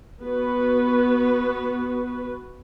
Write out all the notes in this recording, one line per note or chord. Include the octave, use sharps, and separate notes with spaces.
B3 F#4 B4